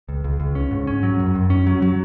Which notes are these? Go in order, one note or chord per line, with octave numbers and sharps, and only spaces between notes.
C#2
C#2
C#2
C#4
G#2
C#4
F#3
F#2
F#2
C#4
F#3
F#3